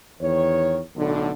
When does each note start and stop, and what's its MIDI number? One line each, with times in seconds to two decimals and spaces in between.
0.21 0.79 40
0.21 0.79 51
0.21 0.79 73
0.95 1.30 35
0.95 1.30 45
0.95 1.30 50